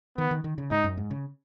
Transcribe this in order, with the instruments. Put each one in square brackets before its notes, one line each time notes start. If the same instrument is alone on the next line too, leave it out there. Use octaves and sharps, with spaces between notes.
[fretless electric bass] D#3 [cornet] B3
[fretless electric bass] D#3
D#3
C#3
[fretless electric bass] G#2 [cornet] D#4
[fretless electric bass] F#2
G#2
C#3